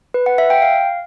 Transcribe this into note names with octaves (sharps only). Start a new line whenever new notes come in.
B4
F#5
E5
G5
F5